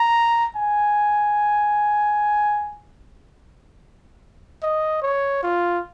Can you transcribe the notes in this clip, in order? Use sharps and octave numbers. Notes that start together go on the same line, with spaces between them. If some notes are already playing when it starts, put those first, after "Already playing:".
Already playing: A#5
G#5
D#5
C#5
F4